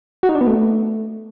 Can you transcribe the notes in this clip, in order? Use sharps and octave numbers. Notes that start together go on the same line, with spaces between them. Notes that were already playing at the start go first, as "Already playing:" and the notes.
F#4
D#4
D4
B3
A3